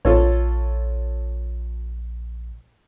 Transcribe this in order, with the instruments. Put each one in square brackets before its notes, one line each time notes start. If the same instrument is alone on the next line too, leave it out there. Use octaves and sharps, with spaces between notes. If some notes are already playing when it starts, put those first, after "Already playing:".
[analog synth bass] A#1 [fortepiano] F4 A4 C#5